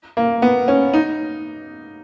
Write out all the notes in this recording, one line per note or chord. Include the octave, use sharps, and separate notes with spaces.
A#3
B3
C#4
D#4